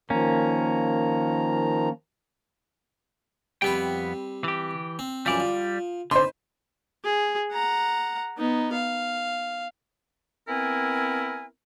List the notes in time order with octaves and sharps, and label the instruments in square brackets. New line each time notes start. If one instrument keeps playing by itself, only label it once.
[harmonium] D#3 F3 A#5 [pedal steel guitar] A#3 C#4
[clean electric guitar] F2 B3 G5 [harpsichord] G3 C4 B4
[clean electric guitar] E3 G4
[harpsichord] C4
[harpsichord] F#2 E3 F3 [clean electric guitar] G3 D5
[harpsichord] F3
[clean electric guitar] D3 [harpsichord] B4 [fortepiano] C5 C6
[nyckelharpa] G#4
F#5 A#5
B3 D#4
F5
[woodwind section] B3 C4 E4 A#4 G#5